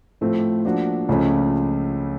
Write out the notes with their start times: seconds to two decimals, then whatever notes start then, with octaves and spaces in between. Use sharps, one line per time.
0.21 A2 F3 A3 C4 F4
0.65 F3 A#3 D4 F#4
1.09 C#2 C#3 F3 A3 C#4